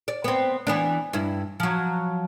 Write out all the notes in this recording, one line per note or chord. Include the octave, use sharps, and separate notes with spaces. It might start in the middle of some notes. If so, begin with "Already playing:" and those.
D5
B3 C4
E3 B3 D4
G2 E4
F3 F#3